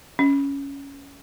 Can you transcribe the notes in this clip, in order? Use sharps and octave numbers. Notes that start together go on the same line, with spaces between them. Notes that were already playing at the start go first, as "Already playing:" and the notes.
C#4